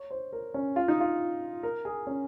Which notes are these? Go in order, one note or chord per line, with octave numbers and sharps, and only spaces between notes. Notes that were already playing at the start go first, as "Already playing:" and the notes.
Already playing: C#5
C5
A#4
C#4
F4
D#4
F4
A#4
G#4
C#4